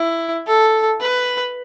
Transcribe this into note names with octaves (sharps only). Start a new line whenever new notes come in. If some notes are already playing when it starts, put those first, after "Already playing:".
Already playing: E4
A4
B4